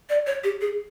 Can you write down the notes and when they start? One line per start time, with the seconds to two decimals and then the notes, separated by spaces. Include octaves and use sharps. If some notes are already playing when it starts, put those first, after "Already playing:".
0.10 D5
0.27 C#5
0.44 G4
0.61 G#4